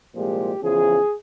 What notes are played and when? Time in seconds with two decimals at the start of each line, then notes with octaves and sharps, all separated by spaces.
0.15 C2 A#2 F3 G#3 G4
0.62 E2 C#3 F3 G#4